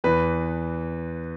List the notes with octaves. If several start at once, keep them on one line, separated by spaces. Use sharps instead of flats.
E2 E3 B4